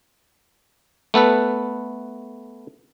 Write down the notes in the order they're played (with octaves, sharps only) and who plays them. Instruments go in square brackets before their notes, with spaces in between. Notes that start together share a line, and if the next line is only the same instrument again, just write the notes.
[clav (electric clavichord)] A3 B3 A4 B4